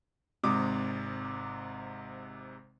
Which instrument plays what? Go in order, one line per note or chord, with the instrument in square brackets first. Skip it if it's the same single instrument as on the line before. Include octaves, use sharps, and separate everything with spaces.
[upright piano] G#1 G#2 C3 D6 D#6